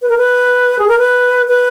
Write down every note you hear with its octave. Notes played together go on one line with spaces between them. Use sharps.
B4
A#4
B4
G#4
A#4
B4
B4